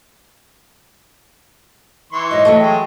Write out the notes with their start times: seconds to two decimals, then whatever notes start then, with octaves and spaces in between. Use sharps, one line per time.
2.12 E3 C6 C#6
2.31 G#2 F#3 D#5
2.45 E3 F#3 A3 C#6
2.59 G#3 G5